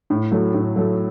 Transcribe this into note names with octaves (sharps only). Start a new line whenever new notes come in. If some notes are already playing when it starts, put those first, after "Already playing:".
A2
F#3 A3
A2
F#3 A3